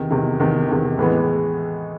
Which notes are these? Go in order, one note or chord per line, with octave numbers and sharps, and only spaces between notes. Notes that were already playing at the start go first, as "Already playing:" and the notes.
Already playing: E2 C3 D#3
E2 C3 D#3
E2 C3 D#3
E2 C3 D#3
A2 E3 G#3 B3